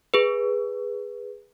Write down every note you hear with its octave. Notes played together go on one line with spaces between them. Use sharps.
G#4 B4